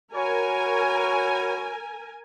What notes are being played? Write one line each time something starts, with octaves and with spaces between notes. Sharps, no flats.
F#4 A#4 B4 C#5 G#5